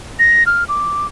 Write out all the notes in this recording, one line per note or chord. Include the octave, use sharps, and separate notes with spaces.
A#6
F6
D6